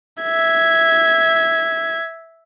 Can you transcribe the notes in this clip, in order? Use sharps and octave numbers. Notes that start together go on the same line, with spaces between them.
E5 G#6